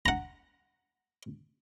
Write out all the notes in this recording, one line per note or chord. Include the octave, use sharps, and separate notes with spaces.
F#5 A#5